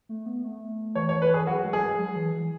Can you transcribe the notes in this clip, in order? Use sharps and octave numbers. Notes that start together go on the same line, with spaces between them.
A3
B3
A3
E3 C#5
C#5
B4
G#4
F#3 F#4
G#3
F#3 G#4
G#3
F#3
F#3
E3
E3